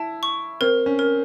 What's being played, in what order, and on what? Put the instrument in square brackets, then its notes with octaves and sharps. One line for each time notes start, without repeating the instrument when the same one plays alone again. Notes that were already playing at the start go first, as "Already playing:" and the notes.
Already playing: [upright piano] E4 [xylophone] A5
[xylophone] C#6
[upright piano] C4 [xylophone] A#4
[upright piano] C#4
[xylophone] A#4